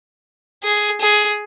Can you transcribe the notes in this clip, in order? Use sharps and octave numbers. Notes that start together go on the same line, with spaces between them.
G#4
G#4